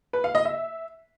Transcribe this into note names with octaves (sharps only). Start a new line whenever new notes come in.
B4
F5
D#5
E5